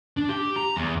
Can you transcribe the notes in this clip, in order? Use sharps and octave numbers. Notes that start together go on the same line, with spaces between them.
D4
G4
A#5
E2